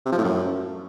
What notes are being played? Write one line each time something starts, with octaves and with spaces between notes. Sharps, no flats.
C3
F3
A2
F#2